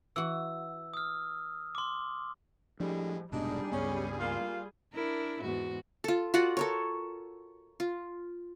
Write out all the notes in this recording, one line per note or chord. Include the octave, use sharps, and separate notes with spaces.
E3 F#4 E6
D#6 F6
C6 D6
A2 F3 G3 G#3 D4
F1 G#2 B2 G3 D4 D#4 G#4
C#2 G2 B3 C#4
A#3 F4
D4 E4 A#4
E2 G#2 F#4
F4 A4
F4 F#4 D5 F#5
A4 A#4 C#5
F4